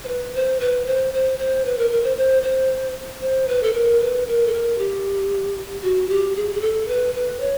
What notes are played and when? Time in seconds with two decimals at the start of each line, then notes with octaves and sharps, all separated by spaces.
0.04 C5
0.08 B4
0.35 C5
0.60 B4
0.86 C5
1.14 C5
1.39 C5
1.65 B4
1.78 A#4
1.91 A#4
2.04 C5
2.17 C5
2.43 C5
3.21 C5
3.48 B4
3.63 A4
3.74 A#4
4.01 B4
4.27 A#4
4.47 A4
4.53 A#4
4.78 G4
5.83 F#4
6.09 G4
6.36 G#4
6.55 G#4
6.61 A4
6.88 B4
7.14 B4
7.40 C#5